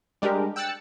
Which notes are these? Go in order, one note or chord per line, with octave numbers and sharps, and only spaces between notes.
G3 G#3 D4 G4 A#4
G5 E6 F#6 A6 C#7